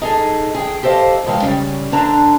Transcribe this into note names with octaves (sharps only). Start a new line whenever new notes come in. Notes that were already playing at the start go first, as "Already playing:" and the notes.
D#4 G#4 A4
G#4 G5
G4 A4 C5 D#5 F5
F2 D#3 G#3 F5 G5
C#3 G3 C#4
D3 D4 A#5